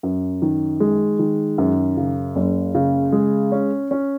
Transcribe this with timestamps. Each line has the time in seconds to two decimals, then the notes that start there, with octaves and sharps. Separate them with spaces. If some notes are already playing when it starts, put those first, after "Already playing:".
0.03 F#2
0.42 D#3
0.80 G#3
1.19 D#3
1.58 F#2
1.97 C#3
2.36 F#1
2.75 C#3
3.12 G#3
3.52 C#4
3.91 C#4